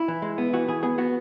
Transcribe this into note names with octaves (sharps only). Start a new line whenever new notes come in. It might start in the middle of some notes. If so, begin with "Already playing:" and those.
Already playing: E4
E3
G#3
B3
E3 F#4
E3 G#4
B3 G#4
B3 F#4